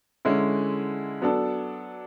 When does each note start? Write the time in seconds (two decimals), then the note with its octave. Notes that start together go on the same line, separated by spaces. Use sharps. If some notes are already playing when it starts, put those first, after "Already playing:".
0.25 D3 G#3 C#4 E4
1.22 F#3 B3 D4 A4